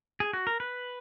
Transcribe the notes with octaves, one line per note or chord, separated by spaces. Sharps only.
G#4
F#4
A#4
B4